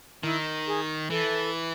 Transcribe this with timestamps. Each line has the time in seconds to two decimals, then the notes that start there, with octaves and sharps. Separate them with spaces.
0.23 D#3 E4
0.67 G#4
1.10 E3 A4